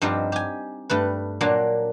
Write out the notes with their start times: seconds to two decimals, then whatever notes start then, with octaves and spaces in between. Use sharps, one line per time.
0.01 G2 F3 C4 D#4 G4
0.32 G4 G#5
0.90 G2 A3 B4
1.41 A#2 F#3 A#3 D4